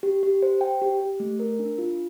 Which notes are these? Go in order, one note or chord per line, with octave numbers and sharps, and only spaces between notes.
G4
G4
C5
G5
G4
G4
A3
A#4
D4
F4